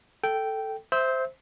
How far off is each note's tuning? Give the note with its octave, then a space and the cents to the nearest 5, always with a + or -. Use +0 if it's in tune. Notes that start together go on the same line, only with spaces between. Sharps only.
A4 +0 G5 -10
C5 +0 E5 +0 E6 -35